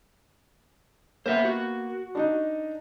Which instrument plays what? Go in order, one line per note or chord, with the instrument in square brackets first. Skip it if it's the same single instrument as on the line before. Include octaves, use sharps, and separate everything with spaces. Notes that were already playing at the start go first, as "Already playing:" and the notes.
[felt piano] A#3 B3 [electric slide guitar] C5 E5
[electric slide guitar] F#4
[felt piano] D4 D#4 D#5